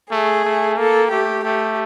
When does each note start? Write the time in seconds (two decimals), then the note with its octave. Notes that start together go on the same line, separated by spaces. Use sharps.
0.11 A3 G#4
0.45 A3
0.78 A#3 A4
1.11 A3 G4
1.44 A3 G4